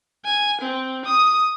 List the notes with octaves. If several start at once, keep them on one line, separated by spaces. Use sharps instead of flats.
G#5
C4
D#6